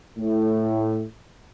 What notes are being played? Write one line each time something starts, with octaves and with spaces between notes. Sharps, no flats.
A2